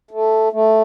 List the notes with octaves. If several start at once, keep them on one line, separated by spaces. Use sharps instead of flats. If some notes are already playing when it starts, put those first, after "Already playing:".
A3
A3